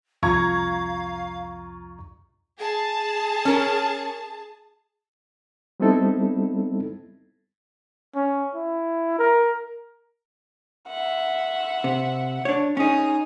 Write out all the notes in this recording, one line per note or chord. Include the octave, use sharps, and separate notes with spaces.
C2 F2 F4 F5 A#5 C#6 G#6
G#4 A5
C#4 A#4
G3 B3 C4 D#4 E4 A4
C#4
E4
A#4
E5 F#5
C3
D4 C#5
C#4 D#4 G#4 D#6